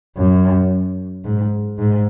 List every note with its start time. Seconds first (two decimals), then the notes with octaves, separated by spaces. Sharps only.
0.17 F#2
1.25 G#2
1.79 G#2